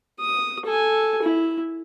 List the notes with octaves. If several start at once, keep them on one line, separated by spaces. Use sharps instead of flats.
D#6
A4 G#5
E4